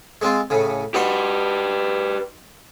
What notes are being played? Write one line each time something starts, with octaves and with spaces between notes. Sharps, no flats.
G#3 C4 F4
A2 C#3
D#4 F#4 G4 B4 C5